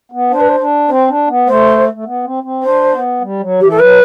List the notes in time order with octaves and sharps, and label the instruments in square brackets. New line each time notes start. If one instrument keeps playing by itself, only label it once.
[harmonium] B3
[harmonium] D4 [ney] C5
[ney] B4
C5
[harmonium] D4
[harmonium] C4 [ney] C5
[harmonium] D4
B3
[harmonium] A3 [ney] C5
[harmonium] A3
B3
C4
C4
[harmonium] D4 [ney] C5
[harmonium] B3
G3
F#3
[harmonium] E3 [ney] G4
[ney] A4
[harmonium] F#3 [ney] B4